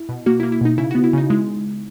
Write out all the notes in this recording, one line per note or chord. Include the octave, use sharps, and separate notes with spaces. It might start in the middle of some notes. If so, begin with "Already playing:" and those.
Already playing: E4
B2
A#3 F#4
E4
A#3
E4
B2 D#4
C#3 E4
B3 F#4
E4
C#3 D#4
G#3 E4